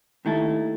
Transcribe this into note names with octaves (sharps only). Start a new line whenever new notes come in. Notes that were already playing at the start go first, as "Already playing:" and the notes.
D#2 D#3 A3 E4 A4